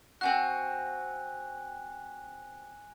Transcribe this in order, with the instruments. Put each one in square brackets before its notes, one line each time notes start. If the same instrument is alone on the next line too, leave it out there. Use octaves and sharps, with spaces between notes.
[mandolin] C4 D4 F#4 [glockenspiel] G#5 F#6